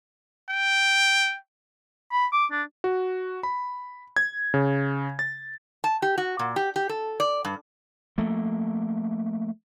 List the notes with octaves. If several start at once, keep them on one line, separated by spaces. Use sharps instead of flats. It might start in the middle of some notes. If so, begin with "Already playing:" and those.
G5
B5
D6
D4
F#4
B5
G#6
C#3
A6
A5
G4
F#4
A#2
G4
G4
A4
D5
G2
F3 A3 A#3